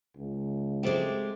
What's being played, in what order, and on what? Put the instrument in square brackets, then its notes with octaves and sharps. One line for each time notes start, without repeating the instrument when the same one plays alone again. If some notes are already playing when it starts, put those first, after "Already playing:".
[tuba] C#2
[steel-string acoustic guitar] G#3 G4 [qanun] A3 C4 D5